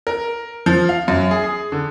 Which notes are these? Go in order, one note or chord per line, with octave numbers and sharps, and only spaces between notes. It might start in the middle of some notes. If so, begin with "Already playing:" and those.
A#4
F3
F5
F#2
G#4
G#4
D3